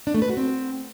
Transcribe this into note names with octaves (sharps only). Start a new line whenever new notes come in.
D4
A3
B4
F#4
C4